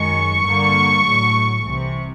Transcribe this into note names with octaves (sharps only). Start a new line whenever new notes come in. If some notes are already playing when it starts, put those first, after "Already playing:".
Already playing: F#2 D#3 G#3 C#6
G2 D3 G3 A#3
A2 F#3 A3
C2 C3 E3